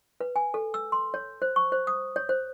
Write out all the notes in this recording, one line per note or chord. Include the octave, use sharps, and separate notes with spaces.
B4
G#5
A4
E6
C6
C#5
C5
C#6
C5
D#6
C#5
C5